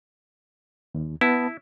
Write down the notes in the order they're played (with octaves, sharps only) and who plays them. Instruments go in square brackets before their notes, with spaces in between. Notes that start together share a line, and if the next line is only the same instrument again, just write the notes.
[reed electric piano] D#2
[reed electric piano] B3 A5 [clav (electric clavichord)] E4